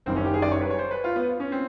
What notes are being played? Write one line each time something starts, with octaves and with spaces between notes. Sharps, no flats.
F#1 F#2 D#3 G3 C4
C#4
G4
G#4
D5
C#5
B4
C#5
C5
B4
F4
B3
C#4
C4